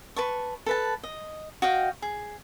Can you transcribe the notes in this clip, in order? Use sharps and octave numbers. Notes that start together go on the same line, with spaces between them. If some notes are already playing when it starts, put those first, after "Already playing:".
B4 A5 C#6
A4 B4 A5
D#5
F#4 D#5 F5 G5
G#4